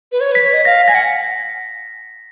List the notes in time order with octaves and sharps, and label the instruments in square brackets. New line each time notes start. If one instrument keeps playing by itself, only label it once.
[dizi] B4
C#5
B4
[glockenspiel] B6
[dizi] C#5
D#5
[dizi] F5 [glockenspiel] A#6
[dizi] G#5 [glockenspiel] A#6
[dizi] F#5